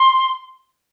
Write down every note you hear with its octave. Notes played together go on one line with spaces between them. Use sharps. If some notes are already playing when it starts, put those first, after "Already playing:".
Already playing: C6